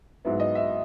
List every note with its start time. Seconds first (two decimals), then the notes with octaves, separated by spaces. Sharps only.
0.25 G#2 F#3 B3 E4
0.40 D#5
0.55 E5